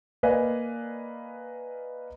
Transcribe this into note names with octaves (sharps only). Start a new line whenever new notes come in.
A#3 B4 D5 D#5 F5 G#5